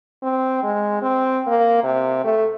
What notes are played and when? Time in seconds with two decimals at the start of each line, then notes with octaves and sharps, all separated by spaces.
0.23 C4
0.63 G#3
1.02 C4
1.47 A#3
1.84 C3
2.24 A3